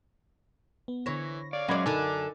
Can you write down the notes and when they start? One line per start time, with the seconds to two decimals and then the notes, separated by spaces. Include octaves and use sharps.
0.88 B3
1.06 D3 E3 E4 C#5 A#6
1.53 C#5 D5 F5
1.68 F#3 G#3 C#4 D5 F#5 B5 G#6
1.86 F#2 D3 D4 D#4 A4 A#4 G#5 D6